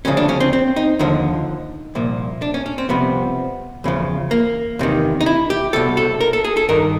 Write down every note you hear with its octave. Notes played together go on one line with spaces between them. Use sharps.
D2 C#3 F3 C#4
D4
C#4
C4
C4
D#4
D#2 D3 F3 D#4
C2 A#2 F3
D4
C#4
C#4
C4
C2 C3 F3 B3
E2 C#3 F3
A#3
E2 C3 D#3
D#4
E4
G4
C2 B2 A4
A4
A#4
A4
G#4
A4
G2 D#3 A#4